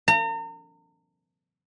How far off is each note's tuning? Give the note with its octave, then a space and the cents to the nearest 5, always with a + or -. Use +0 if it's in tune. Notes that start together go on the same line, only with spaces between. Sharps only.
A#5 -40